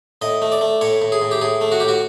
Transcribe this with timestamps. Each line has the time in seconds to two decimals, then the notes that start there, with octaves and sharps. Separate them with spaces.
0.22 A2 D#5
0.42 A3
0.52 D5
0.61 A3
0.81 A2 C#5
1.02 A2
1.12 G#4
1.22 A2
1.31 G4
1.41 A2 G#4
1.61 A3
1.72 F#4
1.80 A2 G4
1.88 F#4